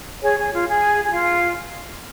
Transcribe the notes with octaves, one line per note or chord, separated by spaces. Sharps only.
G#4 C#5
G#4
F4
G#4
G#4
F4